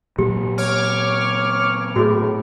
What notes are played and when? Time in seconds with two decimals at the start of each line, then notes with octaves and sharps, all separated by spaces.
0.18 A#2 F#3 G4
0.58 C#5 D6 F6
1.96 A2 F#4 G#4